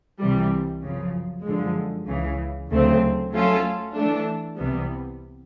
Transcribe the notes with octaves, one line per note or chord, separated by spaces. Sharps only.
C2 C3 E3 G3
F#2 C#3 F3
F#2 D3 F3 G#3
C#2 C#3 E3
D2 C#3 F#3 A3 C4
F#3 A3 C#4 F4 A4
E3 A3 D4
C2 C3 E3 G3 B3